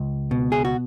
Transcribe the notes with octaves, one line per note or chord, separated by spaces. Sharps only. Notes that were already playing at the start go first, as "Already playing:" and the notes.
Already playing: C#2
B2
G#4
F#4